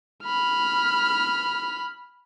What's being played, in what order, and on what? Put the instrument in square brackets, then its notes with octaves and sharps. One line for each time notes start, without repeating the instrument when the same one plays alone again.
[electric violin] B5 F6